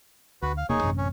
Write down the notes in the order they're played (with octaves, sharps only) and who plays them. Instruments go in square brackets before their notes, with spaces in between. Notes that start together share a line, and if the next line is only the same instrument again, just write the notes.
[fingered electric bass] D2 [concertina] F#4 B4
[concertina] F5
[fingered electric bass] E1 C3 A#3 [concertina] D#4 G#4 C#5
[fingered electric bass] A1 F#2 C3
[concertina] C#4